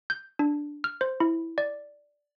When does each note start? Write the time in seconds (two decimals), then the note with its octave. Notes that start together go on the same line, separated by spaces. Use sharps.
0.10 G6
0.39 D4
0.84 F6
1.01 C5
1.20 E4
1.58 D5